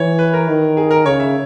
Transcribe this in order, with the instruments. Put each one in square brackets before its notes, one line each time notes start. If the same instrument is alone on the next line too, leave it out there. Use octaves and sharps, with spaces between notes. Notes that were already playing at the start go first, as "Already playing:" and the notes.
Already playing: [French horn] E3 [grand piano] C#5
[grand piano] B4
A#4
[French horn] D#3
[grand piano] G#4
A#4
[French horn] C#3 [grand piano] C#5
[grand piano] E5